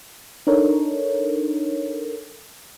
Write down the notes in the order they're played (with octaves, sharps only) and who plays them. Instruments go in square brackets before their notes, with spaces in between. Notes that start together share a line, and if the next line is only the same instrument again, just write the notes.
[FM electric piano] D4 D#4 A4 A#4 C#5